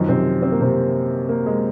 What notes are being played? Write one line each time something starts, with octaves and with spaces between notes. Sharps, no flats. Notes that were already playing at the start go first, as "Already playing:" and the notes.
Already playing: F#2 D#3 F3 D#4
C3 C4
C4
A#3
C3 C4
A#3
G#3